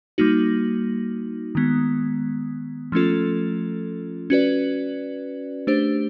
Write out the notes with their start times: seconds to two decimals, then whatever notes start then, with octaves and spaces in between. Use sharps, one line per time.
0.18 G3 A#3 D#4 F#4
1.55 D#3 G#3 B3
2.92 F3 A3 C#4 F4 A4
4.30 C#4 F#4 B4 D5
5.67 A3 D4 G4 C5